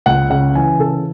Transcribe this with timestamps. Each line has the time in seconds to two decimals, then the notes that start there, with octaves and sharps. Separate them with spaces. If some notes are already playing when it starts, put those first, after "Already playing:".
0.06 C#2 F#5
0.30 C#3 F#5
0.55 E3 G#5
0.79 C#3 A4